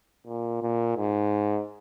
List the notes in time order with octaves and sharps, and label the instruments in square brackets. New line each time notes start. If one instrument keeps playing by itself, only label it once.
[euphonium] A#2
A#2
G#2